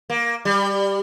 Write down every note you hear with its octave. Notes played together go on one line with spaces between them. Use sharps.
A#3
G3